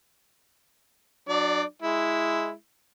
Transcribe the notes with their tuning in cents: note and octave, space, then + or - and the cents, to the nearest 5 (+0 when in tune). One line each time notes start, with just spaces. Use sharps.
F#3 +0 D4 +30 D5 -10
G#3 +0 E4 +0